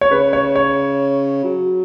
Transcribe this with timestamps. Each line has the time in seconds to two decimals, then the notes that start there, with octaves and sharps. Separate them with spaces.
0.01 C#5
0.11 C#3 B4
0.33 C#5
0.56 C#5
1.44 F#3